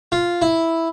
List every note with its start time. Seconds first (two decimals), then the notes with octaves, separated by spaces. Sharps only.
0.12 F4
0.42 E4